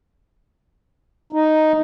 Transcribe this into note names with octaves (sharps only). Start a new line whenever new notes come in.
D#4